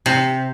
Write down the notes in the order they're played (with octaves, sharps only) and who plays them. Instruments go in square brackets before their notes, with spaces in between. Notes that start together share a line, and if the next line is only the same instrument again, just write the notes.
[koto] C3